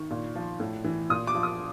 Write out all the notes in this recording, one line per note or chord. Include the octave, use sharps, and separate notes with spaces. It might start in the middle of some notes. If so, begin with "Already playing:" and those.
Already playing: D#3 C#6
A#2
F3
A2
E3
A#2 D#6
D6
F3
D#6